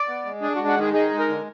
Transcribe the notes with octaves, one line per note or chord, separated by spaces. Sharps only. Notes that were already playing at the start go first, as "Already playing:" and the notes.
Already playing: D5
B3
G#3
D4 G#4
F#4
G#3
F#4
D#3 G#4
D#4 G#4
G#3
A#4
D3